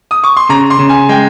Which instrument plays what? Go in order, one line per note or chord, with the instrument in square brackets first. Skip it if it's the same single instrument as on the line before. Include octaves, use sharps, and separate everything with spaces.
[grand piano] D#6
C#6
C6
[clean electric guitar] C#3 [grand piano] A#5
[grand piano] C6
[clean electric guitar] C#3
[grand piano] G#5
[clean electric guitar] G#3 [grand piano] G5